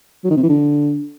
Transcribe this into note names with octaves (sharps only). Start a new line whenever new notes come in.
F#3
D#3
C3
E3
D3